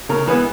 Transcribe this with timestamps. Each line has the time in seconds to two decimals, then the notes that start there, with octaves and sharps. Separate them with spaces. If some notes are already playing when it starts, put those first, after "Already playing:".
0.09 C#3 A#4
0.27 E3 G#3 B3 B4